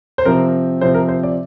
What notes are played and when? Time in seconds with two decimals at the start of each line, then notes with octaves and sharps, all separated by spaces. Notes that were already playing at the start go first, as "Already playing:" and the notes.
0.18 C5
0.25 C3 F3 C4 A#4
0.81 C3 F3 C4 C5
0.94 A#4
1.08 C5
1.23 D5